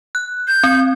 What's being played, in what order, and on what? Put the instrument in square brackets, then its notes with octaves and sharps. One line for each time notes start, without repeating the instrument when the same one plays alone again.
[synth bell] F#6
[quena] G6
[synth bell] C4